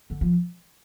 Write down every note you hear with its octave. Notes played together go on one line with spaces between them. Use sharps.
D3
F3